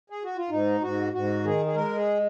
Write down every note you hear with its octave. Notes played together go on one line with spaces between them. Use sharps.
G#4
F#4
F4
G#2 D#4
G#2 F#4
G#2 F#4
D#3 G#4
G#4
G#3 A#4
G#4